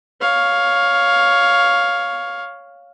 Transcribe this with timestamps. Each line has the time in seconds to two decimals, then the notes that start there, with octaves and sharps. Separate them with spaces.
0.21 C#5 F5